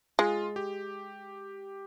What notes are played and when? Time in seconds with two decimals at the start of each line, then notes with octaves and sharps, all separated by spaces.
0.19 G#3 F4
0.56 G4